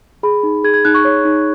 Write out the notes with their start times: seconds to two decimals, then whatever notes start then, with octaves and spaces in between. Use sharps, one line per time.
0.23 G#4 B5
0.43 D#4
0.64 G#4 G#6
0.74 G#6
0.85 D#4 F#6
0.95 C#6
1.05 C#5
1.25 D#4